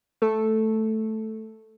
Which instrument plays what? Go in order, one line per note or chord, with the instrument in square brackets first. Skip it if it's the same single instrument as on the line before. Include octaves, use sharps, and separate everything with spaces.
[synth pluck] A3 A4